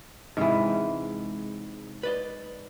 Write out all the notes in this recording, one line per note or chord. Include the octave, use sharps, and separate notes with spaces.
G#2 C3 E3 G#3
B4 D5 D#5